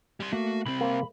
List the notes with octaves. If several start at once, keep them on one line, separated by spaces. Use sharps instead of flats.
G3 C6
A3 A#3 F#4
C2 C4 B5
A#3 C5